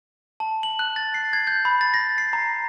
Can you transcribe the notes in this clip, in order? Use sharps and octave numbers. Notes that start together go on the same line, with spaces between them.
A5
F#7
F#6
A6
C7
G#6
G6
B5
A6
A#6
C7
A#5